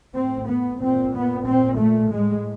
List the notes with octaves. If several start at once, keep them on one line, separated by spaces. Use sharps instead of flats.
A2 C4
B3
A#2 C4
B3
A#2 C4
A3
A2 G#3